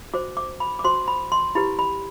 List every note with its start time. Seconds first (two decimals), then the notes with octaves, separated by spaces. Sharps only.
0.14 F#4 C5 D6
0.37 D6
0.60 B5
0.79 D6
0.84 F#4 C5 C6
1.08 B5
1.32 C6
1.55 E4 G4 B4 B5
1.79 B5